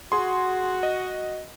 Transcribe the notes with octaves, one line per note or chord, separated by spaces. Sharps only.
F#4 G#4 C6
D#5